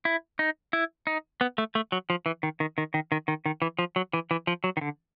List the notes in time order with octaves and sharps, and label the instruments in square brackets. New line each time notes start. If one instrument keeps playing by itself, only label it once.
[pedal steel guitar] E4
D#4
E4
D#4
B3
A3
A3
F#3
F3
E3
D#3
D#3
D#3
D#3
D#3
D#3
D#3
E3
F3
F#3
E3
E3
F3
F#3
D#3
D3